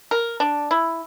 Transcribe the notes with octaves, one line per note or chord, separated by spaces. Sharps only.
A#4
D4
E4